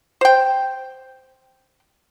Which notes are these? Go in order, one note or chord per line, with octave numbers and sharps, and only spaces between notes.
C5 G5